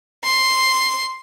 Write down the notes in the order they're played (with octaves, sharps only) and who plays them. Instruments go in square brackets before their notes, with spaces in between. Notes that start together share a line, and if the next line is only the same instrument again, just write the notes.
[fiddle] C6